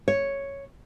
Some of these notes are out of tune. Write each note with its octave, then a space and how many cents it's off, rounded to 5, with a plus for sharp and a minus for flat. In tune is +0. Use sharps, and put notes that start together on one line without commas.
C#5 +0